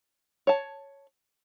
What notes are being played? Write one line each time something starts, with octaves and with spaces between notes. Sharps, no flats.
C#5 A5